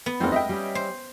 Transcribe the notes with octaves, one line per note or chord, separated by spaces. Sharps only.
B3
E2 A#3 C4 D#4 F4
G#3 D#5 E5 G5
G3 C#4
C5